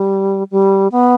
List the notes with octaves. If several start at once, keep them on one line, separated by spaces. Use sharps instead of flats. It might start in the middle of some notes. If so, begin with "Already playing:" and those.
Already playing: G3
G3
B3